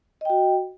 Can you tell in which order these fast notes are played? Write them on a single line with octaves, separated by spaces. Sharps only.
D#5 G5 F#4